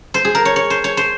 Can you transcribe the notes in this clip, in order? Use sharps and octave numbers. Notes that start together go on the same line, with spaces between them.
C5
G#4
A#4
C#5
C#5
C5
C#5
C5